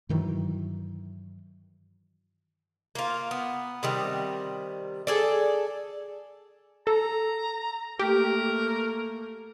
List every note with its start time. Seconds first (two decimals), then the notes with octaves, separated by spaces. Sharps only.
0.09 G2 D#3 E3 F#3
2.95 A#3 F4
3.31 B3
3.83 C3 D#3 G3
5.07 G#4 A4 D5
6.87 A4 A#5
7.99 A3 A#3 G4 A#4